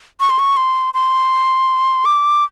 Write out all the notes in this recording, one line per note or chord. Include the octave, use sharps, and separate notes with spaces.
C#6
C6
C#6
C6
C6
D6